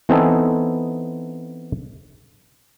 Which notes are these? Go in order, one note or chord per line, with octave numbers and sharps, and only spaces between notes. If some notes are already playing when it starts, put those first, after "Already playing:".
E3 B3 C4 D#4 A4 G#5